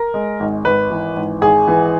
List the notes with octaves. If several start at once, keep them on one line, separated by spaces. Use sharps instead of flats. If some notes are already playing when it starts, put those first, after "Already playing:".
Already playing: A#4
G#3
G#1
G#1 B4
E3
G#1
G#1 G#4
E3